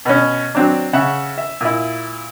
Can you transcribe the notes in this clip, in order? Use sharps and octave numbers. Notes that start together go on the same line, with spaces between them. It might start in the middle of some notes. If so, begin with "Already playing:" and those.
B2 C#4
F#3 C4 D4
C#3 E5 F#5
E5
A#2 E4